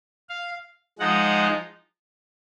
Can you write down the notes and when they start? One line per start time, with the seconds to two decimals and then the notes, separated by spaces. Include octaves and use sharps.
0.29 F5
0.99 F3 G#3 D#4 F#5